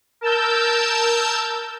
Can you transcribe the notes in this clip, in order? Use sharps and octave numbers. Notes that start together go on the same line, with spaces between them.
A#4 A5 E6 G6